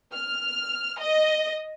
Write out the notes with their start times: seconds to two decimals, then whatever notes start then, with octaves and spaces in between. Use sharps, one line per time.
0.14 F6
1.00 D#5